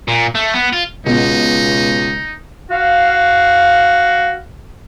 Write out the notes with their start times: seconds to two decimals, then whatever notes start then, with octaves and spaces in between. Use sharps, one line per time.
0.08 A#2
0.35 A3
0.53 B3
0.73 F4
1.06 C#2 B2 D#4
2.70 F#4 F5